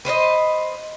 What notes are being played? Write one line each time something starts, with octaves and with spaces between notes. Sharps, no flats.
B4 C5 D5 D#5